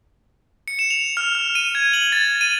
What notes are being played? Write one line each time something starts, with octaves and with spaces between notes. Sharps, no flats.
C#7
E7
F7
F6
F6
D#7
G#6
F#7
A6
D#7